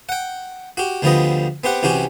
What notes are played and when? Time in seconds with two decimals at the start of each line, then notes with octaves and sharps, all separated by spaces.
0.09 F#5 G5
0.77 F#4 G4
1.02 D2 D3 F3 G3 B3 D#5
1.64 B3 C4 G4 F#5
1.83 C2 C3 E3 C#4 F#4 G4